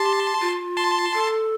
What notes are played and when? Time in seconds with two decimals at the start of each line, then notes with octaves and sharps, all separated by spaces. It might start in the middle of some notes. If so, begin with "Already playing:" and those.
Already playing: G4 A5 C6
0.41 F4
0.77 A5 C6
1.14 A4